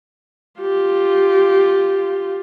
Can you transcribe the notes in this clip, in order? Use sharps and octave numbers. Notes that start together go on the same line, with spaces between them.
F4 G4